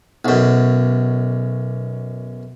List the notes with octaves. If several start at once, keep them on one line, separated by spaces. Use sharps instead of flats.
B1 F#2